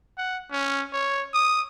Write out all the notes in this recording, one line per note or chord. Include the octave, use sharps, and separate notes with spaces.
F#5
C#4
C#5
D#6